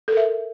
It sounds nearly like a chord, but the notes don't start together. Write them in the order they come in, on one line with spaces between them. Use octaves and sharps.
A4 A#4 E5